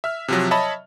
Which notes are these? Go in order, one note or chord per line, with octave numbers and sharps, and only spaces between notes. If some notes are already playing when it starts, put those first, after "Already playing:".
E5 F6
C3 F3 F#3
C#5 D#5 E5 A5 B5